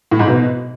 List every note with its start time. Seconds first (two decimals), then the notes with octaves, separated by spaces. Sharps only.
0.11 A2
0.19 G#2
0.27 B2